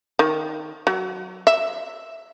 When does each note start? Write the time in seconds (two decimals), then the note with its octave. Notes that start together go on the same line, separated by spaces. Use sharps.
0.19 D#3
0.87 F#3
1.47 E5